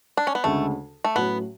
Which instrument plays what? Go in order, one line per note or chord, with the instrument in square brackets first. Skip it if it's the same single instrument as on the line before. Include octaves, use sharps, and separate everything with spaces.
[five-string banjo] D4
C#4
B3
[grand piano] D2 C#3 G#3 [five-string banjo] A3
[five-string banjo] A3
[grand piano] A2 F#3 C#4 [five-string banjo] B3